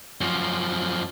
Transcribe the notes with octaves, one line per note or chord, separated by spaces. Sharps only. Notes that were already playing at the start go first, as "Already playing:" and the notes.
F#2 F3